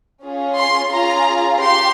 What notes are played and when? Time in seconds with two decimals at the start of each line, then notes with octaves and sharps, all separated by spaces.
0.23 C#4 F4 G#4
0.57 C6
0.92 C#4 F4 G#4 A#5
1.61 G4 C6